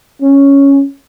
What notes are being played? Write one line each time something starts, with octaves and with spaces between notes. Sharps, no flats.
C#4